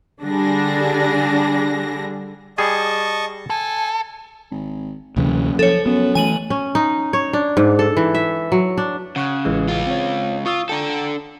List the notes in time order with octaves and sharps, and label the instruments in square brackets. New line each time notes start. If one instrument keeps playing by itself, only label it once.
[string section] D3 G3 D4 G#4 A#6
[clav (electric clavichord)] G3 G#4 G#5 [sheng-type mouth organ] D#5 A5 C#6
[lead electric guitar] A4 [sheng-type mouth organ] G#5
[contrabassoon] G#1
[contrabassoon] F#1 [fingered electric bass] D2 C3 E3
[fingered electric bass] F3 [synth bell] A4 C#5
[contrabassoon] F#2 [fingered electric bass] B3
[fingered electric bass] E3 A3 [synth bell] G#5 D#7 F#7
[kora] C#4
D#4
C#5
D4
G#2
A4
E3
E5
F#3
D4
[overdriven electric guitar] C#3 [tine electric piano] F#5 C#6 F#6
[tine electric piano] A1 E3 G#3
[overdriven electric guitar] C#2 F4
[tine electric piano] C4 C#5
[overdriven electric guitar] F4 [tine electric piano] C#6 D#6 E6
[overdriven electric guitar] D4 A4 [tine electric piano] G5 A#5